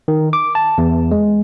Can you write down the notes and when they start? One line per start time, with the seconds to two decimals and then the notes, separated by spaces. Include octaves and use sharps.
0.08 D#3
0.33 D6
0.55 A5
0.78 E2
1.11 G#3